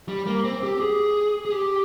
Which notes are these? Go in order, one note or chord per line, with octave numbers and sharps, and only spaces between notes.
G3
A#3
C4
G4
G#4
G#4
G4